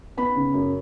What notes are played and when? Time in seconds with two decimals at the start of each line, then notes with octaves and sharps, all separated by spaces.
0.17 B3 B5
0.36 C#3
0.54 F#2